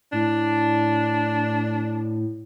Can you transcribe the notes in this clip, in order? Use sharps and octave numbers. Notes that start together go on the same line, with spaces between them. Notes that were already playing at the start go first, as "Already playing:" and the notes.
A2 D4